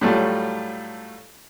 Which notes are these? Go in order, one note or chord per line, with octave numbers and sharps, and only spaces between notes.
A2 F#3 G3 A3 F4